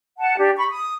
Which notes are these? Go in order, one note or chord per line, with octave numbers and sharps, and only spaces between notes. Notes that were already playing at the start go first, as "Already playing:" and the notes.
F#5 A5
D4 G4
B5 C#6
D#6